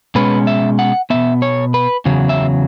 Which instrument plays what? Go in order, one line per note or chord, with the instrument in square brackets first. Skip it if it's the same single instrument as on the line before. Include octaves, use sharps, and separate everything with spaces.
[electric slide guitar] B2 G#3 C#4 B4
E5
F#5
B2 B3 E5
C#5
B4
E2 C#3 F#3
E5